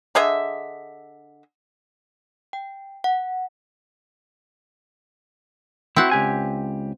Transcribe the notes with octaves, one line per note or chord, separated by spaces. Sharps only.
D3 G#4 D#5 E5
G5
F#5
C4 E4 F#4 F#5
C#2 G4 G#5